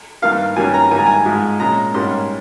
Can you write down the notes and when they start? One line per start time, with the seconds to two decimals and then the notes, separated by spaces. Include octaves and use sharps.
0.22 G2 D#3 A#3 F5
0.56 G2 D#3 G3 A#3 C#4 G#5
0.74 A#5
0.90 G#2 D#3 G3 A#3 G#5
0.98 A#5
1.06 G#5
1.25 G#2 F3 G#3
1.60 A#2 G#3 C#4 A#5
1.94 G#2 G3 A#3 C#4 C6